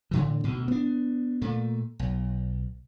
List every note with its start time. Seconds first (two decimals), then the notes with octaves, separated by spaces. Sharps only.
0.11 A2 D3 E3
0.44 D2 B2
0.68 B3 D4
1.41 A#2 A3
1.99 B1